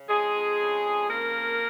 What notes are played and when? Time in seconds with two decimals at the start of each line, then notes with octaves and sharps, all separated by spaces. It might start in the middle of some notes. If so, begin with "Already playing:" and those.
Already playing: C#3
0.08 F2 G#3 G#4
0.35 F2
0.59 C#3
0.84 F2
1.09 C#3 A#3 A#4
1.35 F2